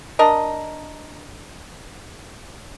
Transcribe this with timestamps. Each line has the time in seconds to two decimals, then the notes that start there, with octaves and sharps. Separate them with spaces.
0.19 D4 A#4 D#5